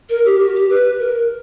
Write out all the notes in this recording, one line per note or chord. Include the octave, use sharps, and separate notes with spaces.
A#4
G4
F#4
G4
B4
A#4